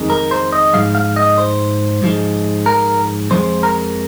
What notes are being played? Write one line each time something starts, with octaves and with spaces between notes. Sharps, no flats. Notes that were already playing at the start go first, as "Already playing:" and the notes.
Already playing: F2 D#3 G#3
A#4
C5
D#5
G#2 F3 G#3 F5
F5
D#5
C5
G#2 F3 G#3
A#4
F2 F3 G#3 C5
A#4